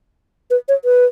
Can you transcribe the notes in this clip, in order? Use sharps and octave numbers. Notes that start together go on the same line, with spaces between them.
B4
C#5
B4